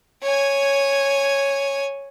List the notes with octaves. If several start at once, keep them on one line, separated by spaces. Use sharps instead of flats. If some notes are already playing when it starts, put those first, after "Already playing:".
C#5 G#5